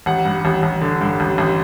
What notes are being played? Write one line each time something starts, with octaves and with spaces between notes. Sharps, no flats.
A1 F#5
G2
A1
A1
D3
G2
A1
A1